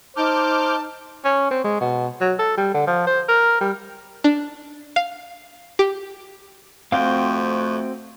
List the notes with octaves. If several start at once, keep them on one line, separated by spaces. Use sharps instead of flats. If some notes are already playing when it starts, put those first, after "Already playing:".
D#4 C5 A5 D6 F6 G6
C#4
C4
G#3
B2
F#3
A4
G3
D3
F3
C5
A#4
G3
D4
F5
G4
F2 A3 C4 F#4 F5 G5